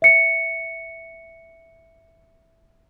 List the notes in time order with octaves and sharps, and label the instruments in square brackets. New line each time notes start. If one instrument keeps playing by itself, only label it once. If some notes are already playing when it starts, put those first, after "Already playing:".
[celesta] E5 C#7